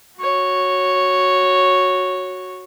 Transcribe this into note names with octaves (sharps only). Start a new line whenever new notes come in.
F#4 C#5